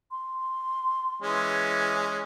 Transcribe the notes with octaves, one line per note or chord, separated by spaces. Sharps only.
C6
E3 G#3 C#4